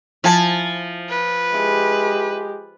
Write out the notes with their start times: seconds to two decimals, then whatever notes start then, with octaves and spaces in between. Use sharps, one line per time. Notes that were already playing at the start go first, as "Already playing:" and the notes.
0.24 F3 E4 G#5 A5
1.10 B4
1.54 G#3 E4 G4